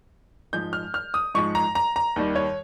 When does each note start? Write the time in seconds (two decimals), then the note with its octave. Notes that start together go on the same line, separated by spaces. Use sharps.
0.53 G#2 F3 G#3 G6
0.73 F6
0.94 F6
1.14 D#6
1.35 G#2 F3 G#3 C#6
1.55 A#5
1.75 A#5
1.96 A#5
2.16 D#2 D#3 G3
2.35 C#5